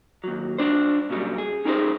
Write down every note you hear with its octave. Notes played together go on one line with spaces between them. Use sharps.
D#2 F#3
G2 D4 C5
A#2 C#3 F#3 G3
G#4
C#4 D#4 G4 G#4 A#4 C5